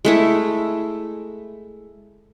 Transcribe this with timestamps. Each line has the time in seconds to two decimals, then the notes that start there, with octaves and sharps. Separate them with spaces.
0.05 G#3 A3 E4